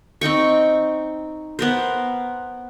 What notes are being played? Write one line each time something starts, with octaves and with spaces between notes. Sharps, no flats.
C4 D#4 G5 C#6
B3 A#4 C5